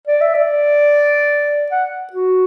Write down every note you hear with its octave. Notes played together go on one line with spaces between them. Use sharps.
D5
E5
D5
F#5
F#4